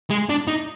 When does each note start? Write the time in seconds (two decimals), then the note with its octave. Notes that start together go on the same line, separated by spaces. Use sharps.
0.10 G#3
0.29 D4
0.48 D#4